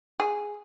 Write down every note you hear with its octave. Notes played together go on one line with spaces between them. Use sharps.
G#4